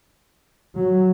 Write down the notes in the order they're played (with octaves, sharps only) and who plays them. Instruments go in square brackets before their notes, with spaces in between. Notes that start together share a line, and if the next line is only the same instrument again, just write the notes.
[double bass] F#3